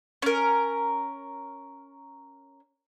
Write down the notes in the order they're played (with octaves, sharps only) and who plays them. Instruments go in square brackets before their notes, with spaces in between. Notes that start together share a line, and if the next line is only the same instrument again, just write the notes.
[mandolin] C#4 A#4